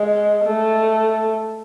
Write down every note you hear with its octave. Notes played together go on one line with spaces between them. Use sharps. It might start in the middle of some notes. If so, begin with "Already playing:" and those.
Already playing: G#3
A3